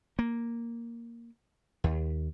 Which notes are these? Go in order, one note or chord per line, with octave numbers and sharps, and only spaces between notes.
A#3
D#2